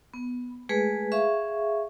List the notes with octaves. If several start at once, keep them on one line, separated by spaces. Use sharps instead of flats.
B3
G#3 A3 G#4 B4
G#4 E5 F5 C#6